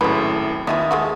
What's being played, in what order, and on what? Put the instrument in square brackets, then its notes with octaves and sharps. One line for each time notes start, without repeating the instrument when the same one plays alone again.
[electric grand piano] G#1 F#2 A2 [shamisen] G#3 B4
[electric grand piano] D#2 E5 D#6 [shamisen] E3 F4 D#5
[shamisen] G#3 A3 F#4